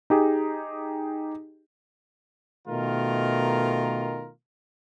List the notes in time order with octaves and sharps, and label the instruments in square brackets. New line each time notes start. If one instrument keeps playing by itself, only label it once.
[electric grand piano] D#4 G4 G#4
[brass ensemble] B2 D#3 A3 F4 A#4